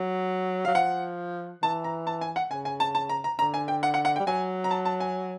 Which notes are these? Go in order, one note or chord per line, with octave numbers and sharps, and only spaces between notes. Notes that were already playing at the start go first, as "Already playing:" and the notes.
Already playing: F#3
F#3 F5
F3 F#5
E3 A5
A#5
A5
G#5
F#5
C#3 G#5
G#5
A5
A5
A#5
A#5
D3 A#5
G#5
G5
F#5
F#5
F#5
G5
G3
F#3 G#5
A#5
A5
A5
G#5